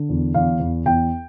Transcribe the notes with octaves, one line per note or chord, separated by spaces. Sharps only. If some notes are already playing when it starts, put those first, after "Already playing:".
Already playing: D3
E2
E2 F5
E2
E2 G5